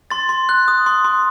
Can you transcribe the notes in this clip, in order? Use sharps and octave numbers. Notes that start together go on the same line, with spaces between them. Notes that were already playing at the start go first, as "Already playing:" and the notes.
C6 A6
C6
F#6
D#6
C6
C6